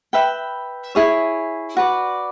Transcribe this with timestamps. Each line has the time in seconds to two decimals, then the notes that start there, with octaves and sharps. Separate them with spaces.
0.13 B4 E5 G5 B5
0.95 E4 G#4 C#5
1.77 F#4 B4 D5